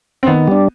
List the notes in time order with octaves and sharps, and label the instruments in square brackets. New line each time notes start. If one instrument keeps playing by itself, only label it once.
[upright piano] C4
[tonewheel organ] D#3 [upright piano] B3
[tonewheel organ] G3 D4